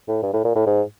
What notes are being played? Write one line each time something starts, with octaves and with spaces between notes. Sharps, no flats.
A2
G2
A2
A#2
A2
G#2